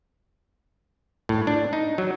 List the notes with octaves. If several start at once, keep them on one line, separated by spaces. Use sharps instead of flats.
A2
D4
D#4
F#3